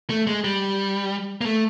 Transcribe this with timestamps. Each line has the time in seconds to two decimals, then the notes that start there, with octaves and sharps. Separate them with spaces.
0.10 A3
0.27 G#3
0.44 G3
1.41 A#3
1.45 A3